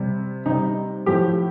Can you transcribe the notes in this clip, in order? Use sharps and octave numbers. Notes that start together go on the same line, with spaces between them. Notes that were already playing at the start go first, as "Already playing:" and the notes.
Already playing: C3 G3
C3 G3 D#4
A2 F3 G4